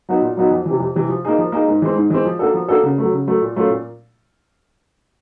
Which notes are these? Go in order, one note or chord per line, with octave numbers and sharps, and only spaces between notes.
F#3 B3 D#4 F#4
A#2
F#3 B3 D#4 F#4
F2
C3 E3
F2
C3 E3
F3
A#3 D#4 G#4
F3
A#3 D#4 G#4
G#2
E3 G#3 C4
G#2
E3 G#3 C4
F3
A#3 D4 F#4 A4
F3
A#3 D4 F#4 A4
C#3
F#3 A3
C#3
F#3 A3
A#2
F#3 A3 C#4 F4
A#2